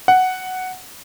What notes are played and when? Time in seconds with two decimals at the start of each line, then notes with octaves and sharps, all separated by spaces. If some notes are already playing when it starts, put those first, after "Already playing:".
0.08 F#5